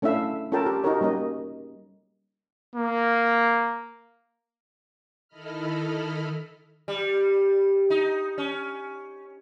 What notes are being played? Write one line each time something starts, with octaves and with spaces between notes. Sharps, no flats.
A3 C#4 D4 E4 E5 F5
C#4 F4 A4 A#4 G5 A5
G4
D#4 F#4 G4 A#4 C#5
G3 A#3 C#4 D#5
A#3
D#3 E4 A4 D#5 B5 F6
G3
D#4
C#4